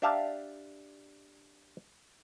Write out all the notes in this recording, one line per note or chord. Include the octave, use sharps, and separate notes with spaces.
D4 G4 E5 F5 A5 A#5